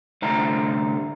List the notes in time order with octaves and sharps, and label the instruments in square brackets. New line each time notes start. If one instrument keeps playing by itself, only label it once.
[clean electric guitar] C2 A2 D3 C5 A#5